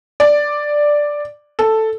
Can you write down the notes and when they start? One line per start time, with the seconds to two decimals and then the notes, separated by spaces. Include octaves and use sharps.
0.20 D5
1.59 A4